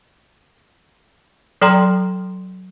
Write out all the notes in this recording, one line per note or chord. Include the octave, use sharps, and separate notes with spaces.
F#3 A4 D5 G5 A#5 C6